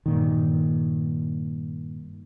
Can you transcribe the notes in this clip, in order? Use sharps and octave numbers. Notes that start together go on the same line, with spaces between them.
G2 A#2 D#3